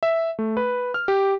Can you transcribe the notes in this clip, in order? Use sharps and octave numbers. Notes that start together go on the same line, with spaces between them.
E5
A3
B4
F6
G4